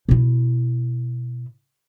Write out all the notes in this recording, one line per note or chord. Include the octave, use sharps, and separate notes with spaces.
B2 E4